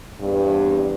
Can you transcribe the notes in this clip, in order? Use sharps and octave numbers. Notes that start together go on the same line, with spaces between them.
E2 G2 C3